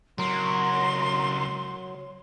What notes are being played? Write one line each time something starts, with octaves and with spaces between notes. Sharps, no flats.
C#2 F#3 A#4 C6